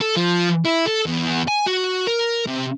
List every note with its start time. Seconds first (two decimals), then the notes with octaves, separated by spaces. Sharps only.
0.01 A4
0.17 F3
0.66 E4
0.88 A4
1.07 E2
1.48 G#5
1.67 F#4
2.07 A#4
2.47 C3